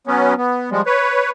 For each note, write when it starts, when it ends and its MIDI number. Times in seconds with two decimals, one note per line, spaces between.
0.07 0.34 54
0.07 0.34 59
0.07 0.34 61
0.38 0.70 59
0.71 0.82 53
0.71 0.82 55
0.71 0.82 56
0.86 1.30 71
0.86 1.30 73